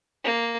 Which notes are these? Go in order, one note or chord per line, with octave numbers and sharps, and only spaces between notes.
A#3